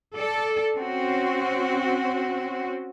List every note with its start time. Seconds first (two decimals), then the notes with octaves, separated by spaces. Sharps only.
0.15 A4 D5
0.76 C4 C#4 F#4